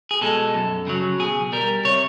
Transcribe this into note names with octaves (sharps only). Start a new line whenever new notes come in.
G#4
B2 G#3 A4
F#2
C#3 F#3
B2 G#4
G3 A#4
C3 C#5